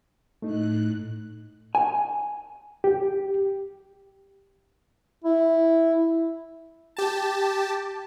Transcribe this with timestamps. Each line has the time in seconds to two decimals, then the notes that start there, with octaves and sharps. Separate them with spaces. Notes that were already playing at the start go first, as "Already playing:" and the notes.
0.42 A2 A3 D#4 F#6
1.75 G#5
2.84 G4
5.24 E4
6.97 G4 A5